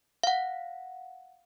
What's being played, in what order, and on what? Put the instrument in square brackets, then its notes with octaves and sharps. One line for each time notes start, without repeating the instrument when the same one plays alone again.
[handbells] F5 F#5